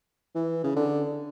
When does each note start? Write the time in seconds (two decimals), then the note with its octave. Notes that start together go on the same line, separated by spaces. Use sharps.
0.35 E3
0.64 C#3
0.76 D3